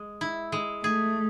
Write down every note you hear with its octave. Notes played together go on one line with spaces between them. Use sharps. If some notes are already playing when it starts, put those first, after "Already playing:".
Already playing: G#3
E4
G#3
A3 G#4